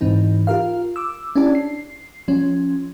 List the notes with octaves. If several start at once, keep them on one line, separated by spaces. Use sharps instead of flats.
G#2 E3 C4 D#4
F4 G4 A#4 F5
D6 E6
C#4 D4 E4 G4 D5 A5
C7
F3 C#4